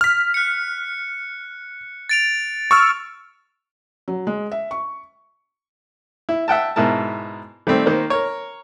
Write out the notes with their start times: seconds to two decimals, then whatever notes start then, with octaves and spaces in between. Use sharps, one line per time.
0.01 F6 B6
0.34 F#6 C#7
2.09 A6 D7 F7
2.71 C#6 E6 F6 A6
4.08 F#3
4.27 G#3
4.52 E5
4.71 C#6
6.29 E4
6.48 E5 F#5 G5 A5
6.76 G#2 B2 E4 A#4 A5
7.67 D#3 G3 A3 C4
7.86 D#3 A#3 C5
8.10 A#4 C#5